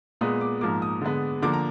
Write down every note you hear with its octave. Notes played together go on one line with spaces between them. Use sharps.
A#2 G#3 B3 D#6
D6
G#2 F3 A#3 D6
D#6
D3 G#3 B3
D3 F3 A#3 D6
A#5